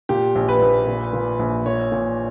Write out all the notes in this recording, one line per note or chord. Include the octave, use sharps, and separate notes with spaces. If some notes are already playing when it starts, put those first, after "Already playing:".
A#2 G4
A#1
B4
A#1
A#2
A#2
A#1
A#2 C#5
A#2